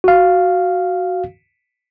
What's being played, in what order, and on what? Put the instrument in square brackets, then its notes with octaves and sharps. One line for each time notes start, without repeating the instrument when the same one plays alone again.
[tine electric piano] F#4 F5